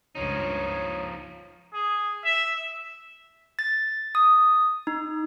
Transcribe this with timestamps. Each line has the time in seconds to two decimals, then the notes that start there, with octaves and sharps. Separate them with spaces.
0.15 C#2 G2 F3 D#4 C#5
1.74 G#4
2.25 E5
3.59 A6
4.15 D#6
4.87 D#4